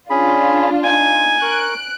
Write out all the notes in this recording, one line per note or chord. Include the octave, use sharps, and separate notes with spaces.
C#4 D4 F4 G#4 B5
D#4 G#5
A#4 C#6 F#6 D7